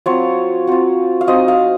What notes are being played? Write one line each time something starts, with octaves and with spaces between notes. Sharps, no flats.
F#3 C4 F4 C#5
F#3 C4 F4
F5
F#3 C4 D#4 D#5
F5